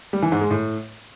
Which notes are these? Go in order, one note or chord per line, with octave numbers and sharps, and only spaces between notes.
G3
E3
G#2
G#3
A2